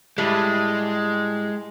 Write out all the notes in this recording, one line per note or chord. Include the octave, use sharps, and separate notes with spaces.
A2 G3 G#3